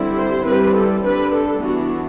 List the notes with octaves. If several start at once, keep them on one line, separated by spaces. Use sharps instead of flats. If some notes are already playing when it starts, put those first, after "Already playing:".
Already playing: D3 G3 C4 E4
C5
G3 C4 E4 B4
A4
D3 G3 D4 B4
A4
E3 B3 D4 F#4